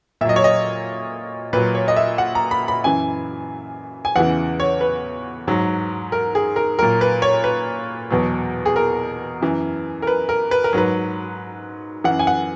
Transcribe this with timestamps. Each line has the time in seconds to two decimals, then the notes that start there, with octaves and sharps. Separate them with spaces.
0.21 A#2 E5
0.25 F#3 D#5
0.36 C#5
0.44 D#5
1.53 A#2 F#3 B4
1.75 C#5
1.88 D#5
1.96 E5
2.18 F#5
2.35 A#5
2.51 B5
2.68 B5
2.84 F#2 E3 G#5
4.05 G#5
4.16 E2 C#3 E3 F#5
4.60 C#5
4.81 B4
5.48 G#2 F#3
6.12 A#4
6.35 G#4
6.56 A#4
6.79 A#2 F#3 A#4
7.01 B4
7.22 C#5
7.44 B4
8.10 E2 B2 F#3
8.66 G#4
8.76 A#4
9.41 F#2 E3
10.02 A#4
10.07 B4
10.29 A#4
10.51 B4
10.64 A#4
10.73 G#2 F#3 B4
12.04 F#2 E3 F#5
12.19 G#5
12.27 F#5